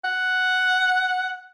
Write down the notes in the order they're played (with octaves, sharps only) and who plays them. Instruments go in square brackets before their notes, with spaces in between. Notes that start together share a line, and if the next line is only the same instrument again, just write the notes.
[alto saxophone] F#5